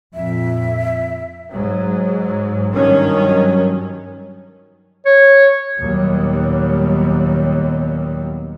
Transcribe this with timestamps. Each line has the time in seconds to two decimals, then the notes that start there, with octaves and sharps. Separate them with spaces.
0.14 F2 A#2 E5
1.51 G#2 F#3
2.74 G2 D#3 F#3 C#4
5.06 C#5
5.78 D#2 A#2 F#3 G3 B3